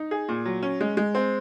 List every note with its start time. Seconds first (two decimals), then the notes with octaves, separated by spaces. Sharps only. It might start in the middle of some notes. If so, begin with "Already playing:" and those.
Already playing: D#4
0.11 G#4
0.29 A#2
0.45 F#3
0.63 C#4
0.81 G#3
0.97 G#3
1.15 C4